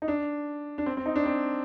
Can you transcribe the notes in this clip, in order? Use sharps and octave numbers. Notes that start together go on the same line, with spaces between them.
D#4
D4
D4
C4
C4
D#4
D4
C4